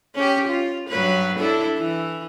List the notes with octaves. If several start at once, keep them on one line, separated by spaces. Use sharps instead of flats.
C#4 G4
F4
G2 F#3 B4
D4 E4 A4
E3